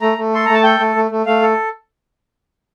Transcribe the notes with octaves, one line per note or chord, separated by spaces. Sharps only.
A3 A#5
A3
A4 C6
A3 A#5
A5
A4 G5
A3
A3
A3
A3 F5
A4